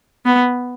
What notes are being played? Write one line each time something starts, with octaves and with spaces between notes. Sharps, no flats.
B3